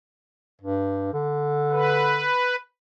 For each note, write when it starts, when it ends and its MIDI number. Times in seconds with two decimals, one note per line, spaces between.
0.62 1.09 43
1.14 2.32 50
1.71 2.56 71